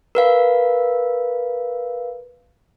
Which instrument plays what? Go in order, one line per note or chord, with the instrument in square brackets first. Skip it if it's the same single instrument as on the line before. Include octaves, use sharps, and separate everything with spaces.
[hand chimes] A#4 B4 F5